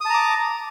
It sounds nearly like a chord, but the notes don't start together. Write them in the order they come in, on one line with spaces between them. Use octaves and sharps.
D#6 A5 A#5 D6